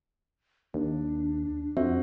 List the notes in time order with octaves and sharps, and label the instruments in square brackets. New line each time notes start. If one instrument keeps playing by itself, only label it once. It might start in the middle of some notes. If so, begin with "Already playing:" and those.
[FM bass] D#2 [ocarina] D4
[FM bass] F2 [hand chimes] C4 F#4 E5